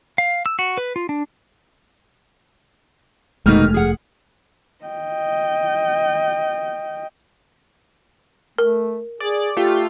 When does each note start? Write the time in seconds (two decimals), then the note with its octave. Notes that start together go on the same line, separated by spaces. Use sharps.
0.18 F5
0.46 E6
0.59 F#4
0.78 B4
0.96 F4
1.09 D4
3.46 F1 D#2 B2 G#3 A3 D#4 F6
3.74 G#4 F#5
4.85 D#5 G5
8.58 A3 A#4
9.20 G#4 D5
9.57 A3 F4 G4